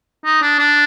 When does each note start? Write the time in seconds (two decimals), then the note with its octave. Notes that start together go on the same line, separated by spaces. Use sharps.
0.25 D#4
0.42 D4
0.59 D4